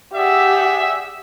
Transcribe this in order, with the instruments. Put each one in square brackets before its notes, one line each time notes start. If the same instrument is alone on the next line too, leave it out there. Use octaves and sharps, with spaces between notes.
[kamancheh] G4 F#5 [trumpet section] G#4 D5 E5